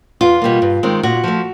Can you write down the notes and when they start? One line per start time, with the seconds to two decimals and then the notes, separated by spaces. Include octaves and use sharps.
0.21 E2 F4
0.42 B2 G3 A#3
0.62 G2
0.83 D#3 G#3 C4
1.03 A#2 F#4
1.24 F3 A3